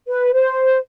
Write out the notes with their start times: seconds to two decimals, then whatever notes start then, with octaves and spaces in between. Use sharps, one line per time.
0.09 B4
0.33 C5